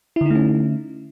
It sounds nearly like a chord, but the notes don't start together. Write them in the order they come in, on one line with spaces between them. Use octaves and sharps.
E4 D3 D#4 A3 C#4